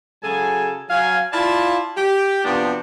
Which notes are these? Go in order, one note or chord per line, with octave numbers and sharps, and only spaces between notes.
C#3 F#3 G#4 A4 G#5
F#3 F5 G#5
E4 F4 D5 F5 A5
G4
C3 F3 B3 D4 F#4 G4